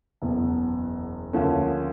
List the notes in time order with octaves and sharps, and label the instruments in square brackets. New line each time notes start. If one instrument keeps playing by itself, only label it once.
[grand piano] F#1 E2 B2
D2 C#3 F3 A#3 C#4